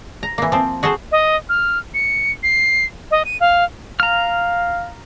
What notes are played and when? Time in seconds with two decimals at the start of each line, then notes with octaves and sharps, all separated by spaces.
0.23 A#5
0.38 E3 A#3
0.52 F3 C4
0.83 F#4 G#4 A4 C5
1.12 D#5
1.49 F6
1.94 C#7
2.43 C7
3.11 D#5
3.25 D#7
3.40 F5
4.00 F5 A#5 F6